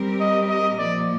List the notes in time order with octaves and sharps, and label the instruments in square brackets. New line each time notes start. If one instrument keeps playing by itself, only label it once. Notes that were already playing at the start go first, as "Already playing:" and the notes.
Already playing: [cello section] G3 C4 G4 A#4
[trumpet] D#5
D#5
[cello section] A#2 F3 A#3 [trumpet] D5